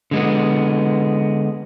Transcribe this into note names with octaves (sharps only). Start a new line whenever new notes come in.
D3 G#3 B3